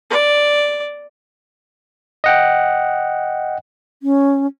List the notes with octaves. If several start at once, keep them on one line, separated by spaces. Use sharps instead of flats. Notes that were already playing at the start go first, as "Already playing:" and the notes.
D5
D#5 F#5 G5
C#4